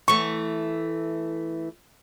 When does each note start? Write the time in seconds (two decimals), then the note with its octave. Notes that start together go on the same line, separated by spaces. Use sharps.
0.08 E3 A3 C#6